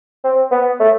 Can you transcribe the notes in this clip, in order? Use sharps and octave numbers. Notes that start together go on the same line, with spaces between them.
C4
B3
A3